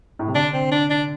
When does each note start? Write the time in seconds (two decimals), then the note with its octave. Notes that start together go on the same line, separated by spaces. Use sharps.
0.19 A2
0.27 C3
0.34 D3 D4
0.53 C4
0.71 D4
0.90 D4